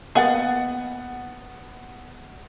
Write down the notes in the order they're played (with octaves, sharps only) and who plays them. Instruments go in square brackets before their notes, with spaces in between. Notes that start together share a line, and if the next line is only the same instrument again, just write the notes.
[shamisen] A#3 G#4 D#5 [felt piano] B3 F#5 A6